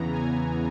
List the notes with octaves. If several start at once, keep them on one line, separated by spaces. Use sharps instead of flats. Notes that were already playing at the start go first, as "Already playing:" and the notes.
Already playing: E2 C#3 E3 B3 A#5
G#5